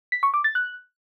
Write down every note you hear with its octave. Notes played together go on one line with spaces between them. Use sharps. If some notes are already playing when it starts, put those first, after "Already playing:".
B6
C#6
D6
A6
F#6